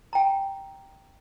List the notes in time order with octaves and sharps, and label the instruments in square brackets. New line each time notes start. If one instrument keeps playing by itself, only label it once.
[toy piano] G5 A#5